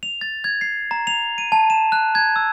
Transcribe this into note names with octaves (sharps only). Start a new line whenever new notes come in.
F7
A6
G#6
C7
A#5
F7
D#7
A5
E7
F#6
G#6
E6